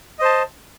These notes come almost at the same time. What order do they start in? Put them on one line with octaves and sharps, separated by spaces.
D#5 C5 A5